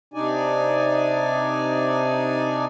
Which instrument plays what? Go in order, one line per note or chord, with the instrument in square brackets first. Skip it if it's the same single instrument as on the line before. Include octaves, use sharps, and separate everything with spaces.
[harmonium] C3 D4 D#4 D5 G#5